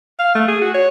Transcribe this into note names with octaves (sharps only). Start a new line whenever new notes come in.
F5
A3
G#4
F#4
C#5